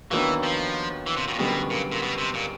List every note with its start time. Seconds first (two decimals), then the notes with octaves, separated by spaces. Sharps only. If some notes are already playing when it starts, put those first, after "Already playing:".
0.11 D#2 D#3 E3 F#3 B3 D4
0.43 F3
1.06 E3
1.17 C3
1.28 B2
1.33 A#2
1.38 F#1 F#2 B2 D3 G3 B3
1.70 A#2
1.92 A#2
2.02 B2
2.18 C3
2.34 A#2